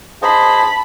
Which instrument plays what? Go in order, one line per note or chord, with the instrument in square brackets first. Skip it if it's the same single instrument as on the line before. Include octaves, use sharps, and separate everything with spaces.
[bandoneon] G#4 C5 D#5 [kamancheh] A5 B5